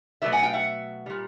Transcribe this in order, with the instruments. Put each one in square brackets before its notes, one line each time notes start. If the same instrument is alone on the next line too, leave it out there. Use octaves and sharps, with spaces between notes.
[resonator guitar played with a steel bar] B2 F#3 A3 D5 E5
F#5 G#5
F5 G5
E5 F#5
A#2 G3